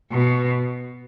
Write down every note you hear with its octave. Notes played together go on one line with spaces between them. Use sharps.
B2